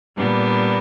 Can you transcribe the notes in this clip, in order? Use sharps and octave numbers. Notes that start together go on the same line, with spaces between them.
A#2 G3 B3 D4